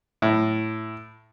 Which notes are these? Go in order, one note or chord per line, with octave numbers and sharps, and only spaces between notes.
A2